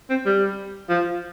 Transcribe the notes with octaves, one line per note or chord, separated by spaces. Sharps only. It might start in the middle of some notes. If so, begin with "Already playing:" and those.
C4
G3
F3